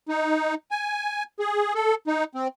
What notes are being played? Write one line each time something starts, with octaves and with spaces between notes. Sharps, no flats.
D#4
G#5
G#4
A4
D#4
C4